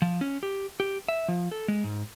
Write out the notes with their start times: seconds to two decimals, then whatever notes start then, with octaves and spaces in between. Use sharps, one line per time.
0.02 F3
0.21 C#4
0.43 G4
0.80 G4
1.08 E5
1.28 F3
1.52 A4
1.68 G#3
1.84 G#2